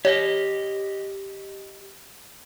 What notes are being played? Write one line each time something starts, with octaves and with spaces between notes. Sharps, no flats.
G4 C#5 D#5